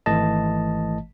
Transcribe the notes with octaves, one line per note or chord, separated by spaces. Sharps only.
G#1 E3 A3 D#5 A5